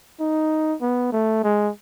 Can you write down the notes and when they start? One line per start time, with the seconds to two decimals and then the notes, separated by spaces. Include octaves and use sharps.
0.20 D#4
0.81 B3
1.12 A3
1.44 G#3